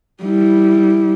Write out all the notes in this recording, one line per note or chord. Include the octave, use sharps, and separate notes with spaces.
G3 E4